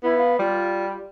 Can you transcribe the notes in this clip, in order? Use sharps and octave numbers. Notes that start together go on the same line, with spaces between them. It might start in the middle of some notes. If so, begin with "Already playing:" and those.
B3 E4
F5
G3 F4